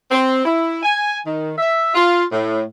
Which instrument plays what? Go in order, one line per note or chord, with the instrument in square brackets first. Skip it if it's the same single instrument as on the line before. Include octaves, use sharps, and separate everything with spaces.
[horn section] C4
E4
G#5
D#3
E5
F4
A2